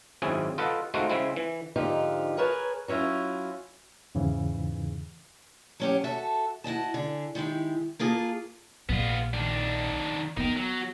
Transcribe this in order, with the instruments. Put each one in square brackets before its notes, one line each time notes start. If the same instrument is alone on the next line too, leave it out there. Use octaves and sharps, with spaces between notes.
[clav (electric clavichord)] G#1 F#2 C4 C#4 E4 G#4
F4 A4 B4 D#5 F#5
G#3 A3 C4 D#4 F4 F#4
C#3 G#3 C4 E4
E3
[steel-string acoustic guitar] G#2 D3 F3 D#4 F4 G4
G#4 A#4 B4 C#5 G#5 A5
F#3 C#4 E4 F4
[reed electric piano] E2 G#2 C#3 E3
[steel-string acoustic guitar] F#3 C#4 G4
F#4 A4 E5
E4 F#4 D#5 A5
D3 G#4
D#3 G#3 E4 G4
A#3 F4 G#4 A4
[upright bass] A#1 [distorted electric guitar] B3 F4
[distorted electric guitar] D#3 D4
[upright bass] B3 [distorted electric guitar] D#4 A#4
[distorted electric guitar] F#3